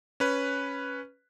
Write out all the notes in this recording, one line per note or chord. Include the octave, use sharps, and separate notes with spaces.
C#4 B4